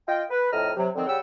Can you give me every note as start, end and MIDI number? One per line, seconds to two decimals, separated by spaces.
0.07 0.22 65
0.07 0.22 75
0.07 0.22 79
0.30 0.50 71
0.51 0.70 41
0.51 0.70 45
0.51 0.70 75
0.51 0.70 82
0.51 0.70 89
0.76 0.88 48
0.76 0.88 54
0.94 1.04 50
0.94 1.04 51
0.94 1.04 53
0.94 1.04 60
1.06 1.17 49
1.06 1.17 55
1.06 1.17 78
1.06 1.17 79
1.06 1.17 88